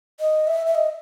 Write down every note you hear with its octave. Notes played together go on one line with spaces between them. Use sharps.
D#5
E5
E5
D#5